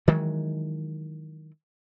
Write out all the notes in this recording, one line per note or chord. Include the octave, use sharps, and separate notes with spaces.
D#3 E3 F#3 G#3